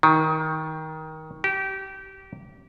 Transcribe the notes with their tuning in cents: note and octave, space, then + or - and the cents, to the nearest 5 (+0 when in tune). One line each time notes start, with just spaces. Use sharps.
D#3 +20
G4 -25